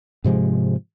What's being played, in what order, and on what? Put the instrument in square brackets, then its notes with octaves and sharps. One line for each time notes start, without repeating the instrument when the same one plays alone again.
[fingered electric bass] G#2 C3 F3 G#3